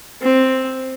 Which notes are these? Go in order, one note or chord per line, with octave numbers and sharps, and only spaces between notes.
C4